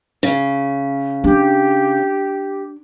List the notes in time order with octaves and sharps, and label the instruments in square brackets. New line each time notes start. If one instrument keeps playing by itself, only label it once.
[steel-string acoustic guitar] C#3
[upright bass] D4 [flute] G4